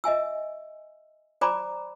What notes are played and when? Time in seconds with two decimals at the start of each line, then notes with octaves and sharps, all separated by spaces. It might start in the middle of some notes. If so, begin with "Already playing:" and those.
0.04 D#5 E5 G#5 E6
1.41 C5 D5 G#5 A#5 B5 D6